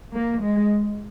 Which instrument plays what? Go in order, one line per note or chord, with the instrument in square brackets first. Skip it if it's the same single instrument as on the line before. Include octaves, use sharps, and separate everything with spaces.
[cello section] A#3
G#3